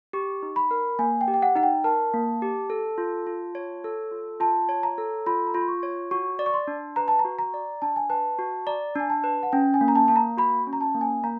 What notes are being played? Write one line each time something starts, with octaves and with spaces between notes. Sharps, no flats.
G4 C#6
D#4
B5
A#4
A#3 G#5
G5
G4
G5
F#5
D#4 F#5
G5
A#4 A5
A#3
G4
A4
F4
F4
C#5
A4
F4
F4 A5
C#5
A#5
A4
F4 B5
A#5
F4 B5
C6
C#6
C#5
F#4 C#6
D5
C#6
C6
D4
B4 A#5
A5
A#5
F#4
A#5
D5
D4 A5
G#5
B4 A5
F#4
D5 A#5
D4 G#5
A5
B4
F#5
C#4 G5
G#5
A#3
A#5
A5
A#3 A5
A#5
F#4 B5
C#4
A#5
A5
A#3
G#5
A#3 A#5